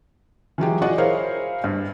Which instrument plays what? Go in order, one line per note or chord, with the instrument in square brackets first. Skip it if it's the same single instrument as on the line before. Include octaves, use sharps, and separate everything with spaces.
[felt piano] E3 F#3 G#3 G4
F#4 G#4 D5 D#5 F#5
E4 G#4 A#4 C5 C#5 F5
G2